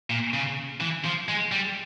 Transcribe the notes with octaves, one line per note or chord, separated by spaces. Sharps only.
A#2
C#3
E3
F3
G#3
G3